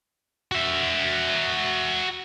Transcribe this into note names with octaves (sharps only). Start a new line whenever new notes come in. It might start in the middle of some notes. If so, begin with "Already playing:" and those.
F#4 E5